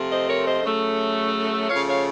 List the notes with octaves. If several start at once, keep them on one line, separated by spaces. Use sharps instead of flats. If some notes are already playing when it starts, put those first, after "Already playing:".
Already playing: C3 F3 A3
C5 D#5
A#4 C#5
C5 D#5
C#3 F#3 A3
C#3 F3 A3 C#5 F5
C#5 F5